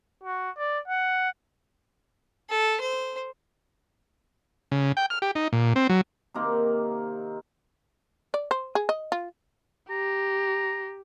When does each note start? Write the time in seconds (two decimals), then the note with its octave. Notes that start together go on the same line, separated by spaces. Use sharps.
0.23 F#4
0.57 D5
0.88 F#5
2.49 A4
2.81 C5
4.72 C#3
4.97 G5
5.10 F6
5.22 G4
5.35 D#4
5.53 A#2
5.76 C4
5.89 F#3
6.34 C3 D#3 A#3 C4
8.34 D5
8.51 C5
8.75 G#4
8.89 D#5
9.12 F4
9.90 G4 A#5